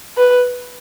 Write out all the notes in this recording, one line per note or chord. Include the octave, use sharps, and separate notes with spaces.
B4